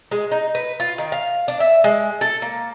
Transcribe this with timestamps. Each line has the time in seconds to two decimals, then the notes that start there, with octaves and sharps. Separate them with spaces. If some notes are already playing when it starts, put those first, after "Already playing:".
0.11 G#3
0.31 D#4
0.55 B4
0.80 F4
0.98 D#3
1.12 F5
1.48 D4
1.60 E5
1.84 G#3
2.21 A4
2.42 A#3